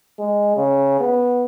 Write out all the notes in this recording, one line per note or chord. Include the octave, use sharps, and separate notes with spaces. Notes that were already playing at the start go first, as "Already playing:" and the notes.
G#3
C#3
B3